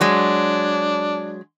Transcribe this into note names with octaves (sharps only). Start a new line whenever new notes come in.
F#3 G#3 D4